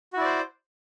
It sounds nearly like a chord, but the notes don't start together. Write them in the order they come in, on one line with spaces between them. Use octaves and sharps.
F#4 E4 D5 C5